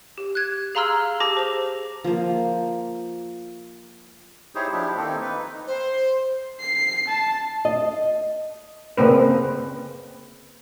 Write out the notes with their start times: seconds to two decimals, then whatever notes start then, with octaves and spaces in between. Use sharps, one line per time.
0.18 G4
0.35 F#6 G#6
0.75 G#4 F5 A#5 C6 E6 F6
1.20 G4 G#4 A5 D6 A#6
1.37 C5 F7
2.04 F3 A#3
4.55 D#4 E4 G4 G#4 C5 C#5
4.72 F3 D4 E4 G4
4.97 D#3 A#3 C4 D#4 A4
5.21 D#4 B4
5.67 C5
6.61 C7
7.08 A5
7.65 D#5
8.97 C#3 A#3 C4 B4